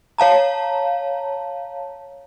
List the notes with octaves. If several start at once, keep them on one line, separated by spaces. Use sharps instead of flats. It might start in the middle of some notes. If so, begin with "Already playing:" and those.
C#5 F5 A5 A#5